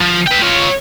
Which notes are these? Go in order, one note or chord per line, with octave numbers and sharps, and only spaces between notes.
F3
B4 G5
F4 C#5